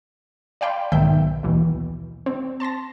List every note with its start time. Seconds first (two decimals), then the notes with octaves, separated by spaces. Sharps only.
0.61 D5 F5 G5 B5 C6
0.92 B1 G#2 D#3 E5 G5 G6
1.43 D#2 B2 E3
2.26 C4
2.60 A5 C6 A6 A#6